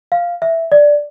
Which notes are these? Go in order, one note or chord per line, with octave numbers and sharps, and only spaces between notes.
F5
E5
D5